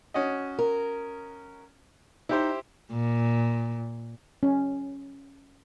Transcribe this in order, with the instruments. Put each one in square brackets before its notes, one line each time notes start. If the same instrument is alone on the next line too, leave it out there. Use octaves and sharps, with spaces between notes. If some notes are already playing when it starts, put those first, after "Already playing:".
[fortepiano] C#4 F#4 D#5
[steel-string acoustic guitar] A#4
[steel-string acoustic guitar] D#4 [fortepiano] E4 G4 C5
[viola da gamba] A#2
[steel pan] C#4